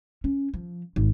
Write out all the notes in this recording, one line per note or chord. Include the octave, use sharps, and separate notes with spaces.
C#4
F3
G#1